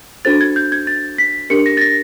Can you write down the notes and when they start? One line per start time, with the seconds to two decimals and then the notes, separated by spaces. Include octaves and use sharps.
0.25 D4 F#4 A4 C5 A6
0.41 G#6
0.56 G6
0.72 G#6
0.87 A6
1.18 B6
1.50 D4 G4 A#4 C#7
1.66 A#6
1.77 A6
1.81 A#6